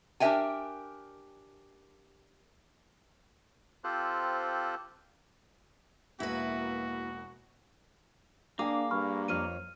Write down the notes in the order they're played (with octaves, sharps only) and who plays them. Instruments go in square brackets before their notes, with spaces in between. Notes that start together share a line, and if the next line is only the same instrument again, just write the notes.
[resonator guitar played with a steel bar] D4 G4 A#4 E5 G5 G#5
[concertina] C4 F4 G4 A4 C5 F#6
[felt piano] E1 A#6 [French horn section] A#3 [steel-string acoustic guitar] E4 B4 [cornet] F#4
[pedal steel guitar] A#3 [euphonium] D4 [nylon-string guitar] G#4 [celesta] F5 G5 D6
[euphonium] G2 [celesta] B5 C#6 F6
[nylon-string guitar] F2 F4 C#5 [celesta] F6 D#7